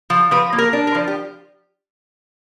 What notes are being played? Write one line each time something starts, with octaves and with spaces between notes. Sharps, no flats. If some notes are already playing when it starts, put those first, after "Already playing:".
F3
F3 B4
A#3
A#4
D4
A#4
F3
G4